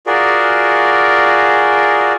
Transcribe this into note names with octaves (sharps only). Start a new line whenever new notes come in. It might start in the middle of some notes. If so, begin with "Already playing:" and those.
F4 F#4 G#4 A#4 D5